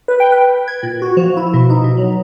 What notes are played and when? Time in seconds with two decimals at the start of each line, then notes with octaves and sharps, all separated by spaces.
0.08 B4
0.20 G5
0.32 B4
0.68 G#6
0.83 A#2
1.02 F#4
1.17 F3
1.37 E4
1.54 B2
1.70 D#4
1.84 B2
1.97 F#3